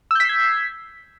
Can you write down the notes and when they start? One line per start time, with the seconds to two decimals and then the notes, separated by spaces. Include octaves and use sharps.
0.11 E6
0.15 G6
0.20 B6
0.25 C7
0.29 G#6